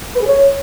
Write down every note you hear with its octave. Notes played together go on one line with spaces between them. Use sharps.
B4
G#4
C#5